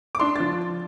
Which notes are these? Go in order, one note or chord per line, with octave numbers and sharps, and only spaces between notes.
D6
D4 C6
F3 A6